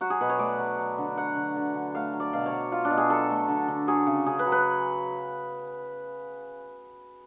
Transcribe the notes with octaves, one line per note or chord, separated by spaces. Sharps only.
F#3 F#4
G#4
B2 B4
C#5
A3 D5
F#3
F#3
D3
F#3 F#5
D3
D3
D3
A3 F5
F#3
D5
B2 F5
C#5
F#3
F#3 F4
D4
B2
G#4
F#3 A4
A3
D3
D3
F#3 G#4
C#3
C#3 G#4
B4
F#3
B4